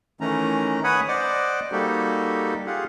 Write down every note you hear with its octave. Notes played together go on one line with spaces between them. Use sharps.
D#3 E3 A3 C#4 A#5
B4 C#5 F#5 G#5 B5 D#6
C5 D5 D#5 F#5 D6
G3 A#3 D#4 F#4 G4 A4
F4 G4 G#4 F5 F#5